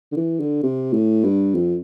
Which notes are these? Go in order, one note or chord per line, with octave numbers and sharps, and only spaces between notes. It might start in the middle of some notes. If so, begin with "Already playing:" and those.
D3
E3
D3
C3
A2
G2
F2